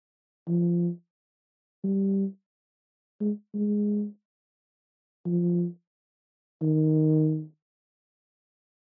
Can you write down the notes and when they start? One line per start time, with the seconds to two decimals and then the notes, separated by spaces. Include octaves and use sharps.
0.48 F3
1.84 G3
3.21 G#3
3.55 G#3
5.26 F3
6.62 D#3